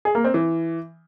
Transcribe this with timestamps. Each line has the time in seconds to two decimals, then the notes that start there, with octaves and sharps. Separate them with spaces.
0.05 G#4
0.15 A#3
0.24 C4
0.34 E3